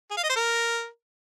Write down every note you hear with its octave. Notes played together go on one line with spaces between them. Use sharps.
G#4
F5
D#5
C5
A#4